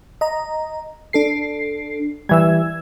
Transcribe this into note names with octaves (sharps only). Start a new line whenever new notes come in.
D#5 A#5
D4 A4 C7
E3 G3 E6 G#6